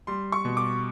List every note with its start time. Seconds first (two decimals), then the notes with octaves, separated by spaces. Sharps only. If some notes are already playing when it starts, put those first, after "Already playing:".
0.07 G3 C6
0.32 C#6
0.45 B2
0.57 D6